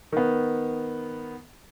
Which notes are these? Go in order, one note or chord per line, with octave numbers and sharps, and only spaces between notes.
D#3 B3